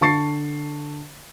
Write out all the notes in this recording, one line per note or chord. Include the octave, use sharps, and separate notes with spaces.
D3 A5 C#6 A6 C7